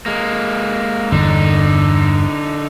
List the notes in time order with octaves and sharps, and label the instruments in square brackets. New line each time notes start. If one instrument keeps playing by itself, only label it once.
[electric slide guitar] G#3 A#3
[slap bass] G1 E2 [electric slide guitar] D3 D#4